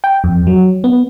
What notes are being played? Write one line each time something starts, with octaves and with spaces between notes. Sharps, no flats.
G5
F2
F#3
B3